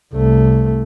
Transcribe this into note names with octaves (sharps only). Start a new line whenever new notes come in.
C2 A3